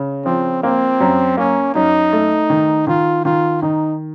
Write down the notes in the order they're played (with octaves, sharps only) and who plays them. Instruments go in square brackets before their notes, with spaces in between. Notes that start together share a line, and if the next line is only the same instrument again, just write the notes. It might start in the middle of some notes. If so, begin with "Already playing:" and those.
Already playing: [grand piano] C#3
[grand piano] F3 [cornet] C4
[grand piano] A#3 [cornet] C4
[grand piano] F#2
[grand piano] A#3 [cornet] C#4
[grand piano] F#2 [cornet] D#4
[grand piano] A3
D#3
[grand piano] D#3 [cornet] F4
[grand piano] D#3 [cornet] F4
[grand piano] D#3 [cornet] D#4